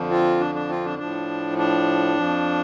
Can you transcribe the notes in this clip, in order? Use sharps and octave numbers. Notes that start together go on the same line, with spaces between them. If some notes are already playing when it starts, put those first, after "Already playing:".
Already playing: F2 D3 F3
C4 F4
D4
D4
C4 F4
D4
A2 F3 D4
D4
F2 F3